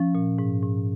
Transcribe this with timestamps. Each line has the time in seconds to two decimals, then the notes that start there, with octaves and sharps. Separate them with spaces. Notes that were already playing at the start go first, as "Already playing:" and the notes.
Already playing: F3 C#4
0.15 A#2
0.39 G#2
0.63 G#2